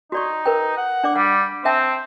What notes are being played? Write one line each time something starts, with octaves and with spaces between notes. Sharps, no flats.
D#4 F#4 D5 C#6
A#4 B4 G5
F#5
D4 D5 D6
G3 F#5
C4 E5 G5 A5